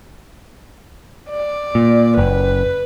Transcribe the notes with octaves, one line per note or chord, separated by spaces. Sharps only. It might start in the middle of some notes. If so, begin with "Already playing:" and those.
D5
A#2
F#1 B4